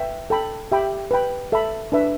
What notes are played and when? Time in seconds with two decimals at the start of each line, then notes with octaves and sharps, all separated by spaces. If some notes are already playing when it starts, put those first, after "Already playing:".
Already playing: B4 E5 G5
0.30 A4 G5 B5
0.72 G4 E5 G5 B5
1.11 B4 G5 B5
1.52 A4 E5 B5
1.92 D4 B4 E5